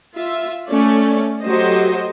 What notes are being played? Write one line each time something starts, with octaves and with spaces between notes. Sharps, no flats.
F4 E5
A3 C#4 D5
F#3 A3 G4 C5 D#5